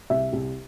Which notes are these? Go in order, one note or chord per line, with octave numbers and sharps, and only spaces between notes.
C2 E5
C2